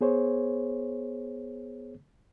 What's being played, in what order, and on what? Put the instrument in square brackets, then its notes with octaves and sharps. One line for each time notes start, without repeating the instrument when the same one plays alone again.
[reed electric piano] B3 G#4 C5 C#5